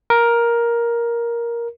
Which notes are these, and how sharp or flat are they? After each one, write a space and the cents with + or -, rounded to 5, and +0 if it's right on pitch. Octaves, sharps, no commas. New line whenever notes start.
A#4 +10